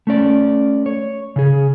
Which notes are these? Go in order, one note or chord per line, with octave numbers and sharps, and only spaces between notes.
A3 C#4 D5
C#5
C#3 G#4